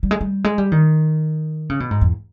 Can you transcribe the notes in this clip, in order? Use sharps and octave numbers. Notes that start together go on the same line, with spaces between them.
G3
G#3
G3
G#3
G3
D#3
C#3
B2
G#2
E2